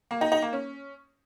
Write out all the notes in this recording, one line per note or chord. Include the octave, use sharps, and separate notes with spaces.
A#3
D#4
D#4
A#3
C#4